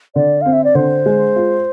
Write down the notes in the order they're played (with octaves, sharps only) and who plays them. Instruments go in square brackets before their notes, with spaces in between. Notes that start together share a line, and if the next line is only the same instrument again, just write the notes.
[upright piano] D3 [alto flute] D5
[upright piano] C4 [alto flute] F5
[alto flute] E5
D5
[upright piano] D3 [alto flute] C5
[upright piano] G#3
F4